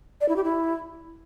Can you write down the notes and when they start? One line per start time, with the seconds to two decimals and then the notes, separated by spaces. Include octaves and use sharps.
0.21 D5
0.29 E4
0.36 G4
0.44 E4